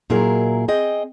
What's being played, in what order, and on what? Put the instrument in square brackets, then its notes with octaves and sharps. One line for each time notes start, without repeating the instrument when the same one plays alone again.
[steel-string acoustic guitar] A#2 F#3 E4 G#4 A#4
C4 G#4 D#5 G5